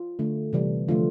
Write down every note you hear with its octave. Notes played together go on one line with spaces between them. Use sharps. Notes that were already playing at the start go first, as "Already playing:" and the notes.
Already playing: F4
D3 A3
C3 E3 G3
D3 F3 A3 F4